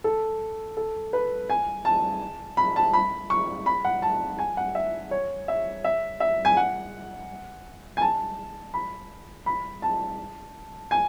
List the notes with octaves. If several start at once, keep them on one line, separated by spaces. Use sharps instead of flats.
A4
A4
B4
G#5
A5
B5
A5
B5
C#6
B5
F#5
A5
G#5
F#5
E5
C#5
E5
E5
E5
G#5
F#5
G#5
A5
B5
B5
A5
G#5